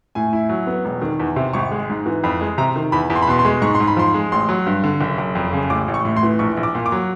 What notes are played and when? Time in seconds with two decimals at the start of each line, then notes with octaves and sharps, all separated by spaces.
0.15 A2 G#5
0.33 E4
0.49 F#3
0.67 B3
0.85 E1
1.02 D#3
1.20 E2
1.36 C3
1.53 G#1 C#6
1.71 G#3
1.89 G#2
2.06 E3
2.24 F2 B5
2.41 G#3
2.58 C3 A#5
2.76 D#3
2.92 E2 B5
3.10 E2
3.16 C6
3.22 B5
3.27 B2 C6
3.39 C6
3.45 G#3
3.62 G#2 C#6
3.75 C6
3.80 G#2
3.87 B5
3.97 F3 C6
4.14 G#3
4.32 A1 C6
4.49 F#3
4.66 G2
4.84 D3
5.01 F#1
5.18 F#1
5.35 F2
5.53 C#3
5.70 A1 D6
5.88 A1
5.94 C#6
6.05 A2
6.16 C6
6.23 E3
6.39 A#1 C#6
6.57 A#1
6.63 D6
6.75 A#2
6.86 D6
6.92 F#3